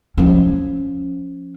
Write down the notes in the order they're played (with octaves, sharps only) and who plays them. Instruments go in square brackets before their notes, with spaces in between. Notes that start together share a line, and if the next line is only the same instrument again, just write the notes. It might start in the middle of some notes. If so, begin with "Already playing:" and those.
[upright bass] F3 C#4